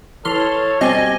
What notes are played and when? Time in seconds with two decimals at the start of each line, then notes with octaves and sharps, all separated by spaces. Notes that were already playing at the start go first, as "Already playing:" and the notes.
0.25 E3 A4 C#5 C6 F6
0.81 B2 G3 C4 D5 D#5 G#5